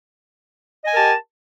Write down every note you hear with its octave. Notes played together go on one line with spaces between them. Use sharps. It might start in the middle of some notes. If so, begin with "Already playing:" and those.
G4 A#4 D#5 G#5 A5